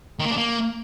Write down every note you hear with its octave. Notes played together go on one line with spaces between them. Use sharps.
D#3
A#3
D4
A#3